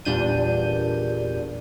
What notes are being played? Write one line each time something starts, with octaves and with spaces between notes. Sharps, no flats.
E2 A#2 G3 D4 G6 D#7